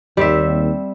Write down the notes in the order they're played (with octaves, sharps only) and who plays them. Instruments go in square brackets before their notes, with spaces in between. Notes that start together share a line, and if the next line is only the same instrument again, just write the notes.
[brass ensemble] D#2 [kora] G3 C4 E5